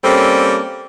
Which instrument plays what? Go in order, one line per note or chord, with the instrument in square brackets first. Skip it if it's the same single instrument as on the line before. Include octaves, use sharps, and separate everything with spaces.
[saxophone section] G3 A#3 C4 C#4 A4